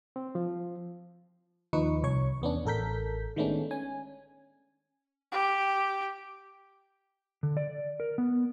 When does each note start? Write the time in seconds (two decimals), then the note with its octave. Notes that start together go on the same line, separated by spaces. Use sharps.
0.16 C4
0.35 F3
1.73 D#2 F3 D#4 B4 C#6
2.03 C2 C#5 C#6
2.42 E2 B3 C#4 D4
2.66 A1 A4 A#4 G6 B6
3.36 D#3 G#3 A3 B3 C#4 D4
3.71 C#4 G#5
5.32 G4
7.43 D3
7.57 D5
8.00 A#4
8.18 B3